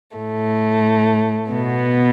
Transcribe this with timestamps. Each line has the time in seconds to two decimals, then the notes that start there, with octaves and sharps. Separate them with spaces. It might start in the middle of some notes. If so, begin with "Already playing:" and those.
0.17 A2 A3
1.52 B2 B3